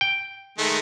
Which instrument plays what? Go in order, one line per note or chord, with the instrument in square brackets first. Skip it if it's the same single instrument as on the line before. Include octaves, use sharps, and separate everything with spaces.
[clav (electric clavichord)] G5
[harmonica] D#3 G#3 A3